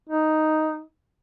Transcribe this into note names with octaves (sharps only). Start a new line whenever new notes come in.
D#4